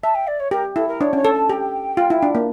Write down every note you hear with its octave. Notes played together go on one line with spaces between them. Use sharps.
E5 A5
G5
D5
C#5
G4 A#4
E4 A4
A#4
D4 C#5
C#4 C#5
A4
A5
G4 G5 A5
F4
E4
D4
A#3